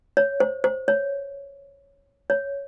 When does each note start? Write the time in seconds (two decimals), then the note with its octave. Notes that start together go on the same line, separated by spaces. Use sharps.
0.17 C#5
0.40 C5
0.64 C5
0.88 C#5
2.30 C#5